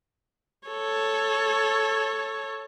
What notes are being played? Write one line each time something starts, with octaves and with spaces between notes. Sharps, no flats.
A4 C#5